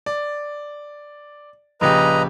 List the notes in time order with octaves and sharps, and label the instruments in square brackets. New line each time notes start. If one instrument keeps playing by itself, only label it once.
[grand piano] D5
[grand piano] A#1 C#3 G4 [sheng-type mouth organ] B4 D#5 A#5